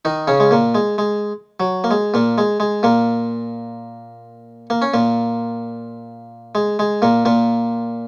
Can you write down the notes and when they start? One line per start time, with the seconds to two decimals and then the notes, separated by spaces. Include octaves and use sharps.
0.05 D#3 D#4
0.28 C#3 C#4
0.40 G#3
0.51 A#2 A#3
0.75 G#3
0.98 G#3
1.60 F#3
1.84 A#3
1.91 G#3
2.14 A#2 A#3
2.38 G#3
2.60 G#3
2.83 A#2 A#3
4.70 A#3
4.82 C#4
4.94 A#2 A#3
6.55 G#3
6.79 G#3
7.02 A#2 A#3
7.25 A#2 A#3